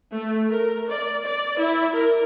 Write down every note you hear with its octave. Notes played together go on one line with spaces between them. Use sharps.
A3
A#4
D5
D5
E4
A#4